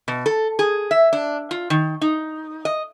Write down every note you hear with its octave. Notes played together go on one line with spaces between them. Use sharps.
B2
A4
G#4
E5
D4
F4
D#3
D#4
D#5